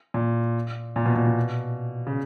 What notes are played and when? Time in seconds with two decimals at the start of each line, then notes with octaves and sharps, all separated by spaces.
0.14 A#2
0.96 A#2
1.06 B2
1.16 A#2
1.27 B2
2.07 C#3